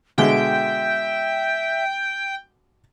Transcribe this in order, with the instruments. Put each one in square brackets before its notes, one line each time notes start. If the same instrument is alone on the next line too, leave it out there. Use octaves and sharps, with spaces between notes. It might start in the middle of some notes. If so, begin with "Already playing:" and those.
[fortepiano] B2 D3 G#3 [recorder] E5 [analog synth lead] G5